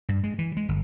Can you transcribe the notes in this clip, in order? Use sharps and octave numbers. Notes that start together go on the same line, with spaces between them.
G2
G#3
E3
G#3
G1